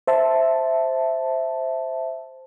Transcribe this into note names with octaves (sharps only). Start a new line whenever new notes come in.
C5 E5 A5